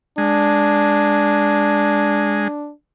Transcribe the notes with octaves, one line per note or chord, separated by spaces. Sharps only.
G#3 D4